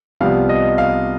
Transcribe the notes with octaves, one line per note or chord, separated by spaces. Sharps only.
C2 C3 F3 B3 F5
D#5
F5